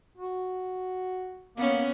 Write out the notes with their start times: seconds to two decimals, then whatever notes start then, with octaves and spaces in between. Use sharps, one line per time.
0.17 F#4
1.57 A#3 B3 C#4